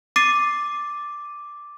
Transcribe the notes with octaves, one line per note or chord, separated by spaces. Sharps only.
D6 A6 C7 D#7